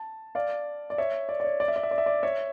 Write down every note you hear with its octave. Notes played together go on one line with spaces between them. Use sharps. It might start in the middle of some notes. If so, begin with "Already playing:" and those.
Already playing: A5
D5 F5
D5
C#5 E5
D5
D5
C#5
D5
E5
D5
E5
D5
E5
D5
C#5 E5